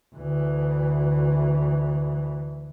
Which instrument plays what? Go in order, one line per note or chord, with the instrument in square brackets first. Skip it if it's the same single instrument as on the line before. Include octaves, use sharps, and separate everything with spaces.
[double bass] D2 E3